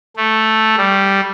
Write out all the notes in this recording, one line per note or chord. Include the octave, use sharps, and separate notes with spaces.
A3
G3